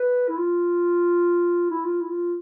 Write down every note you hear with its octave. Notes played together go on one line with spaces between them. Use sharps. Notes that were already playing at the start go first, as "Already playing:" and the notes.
Already playing: B4
E4
F4
E4
F4
E4
F4